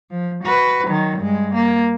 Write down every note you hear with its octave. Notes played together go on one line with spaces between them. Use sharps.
F3
F#4 B4
D#3 F#3
G2 G#3
A#3